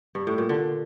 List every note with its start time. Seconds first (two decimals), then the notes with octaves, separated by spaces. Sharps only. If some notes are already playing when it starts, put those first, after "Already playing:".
0.15 G2
0.27 A2
0.38 A#2
0.49 D3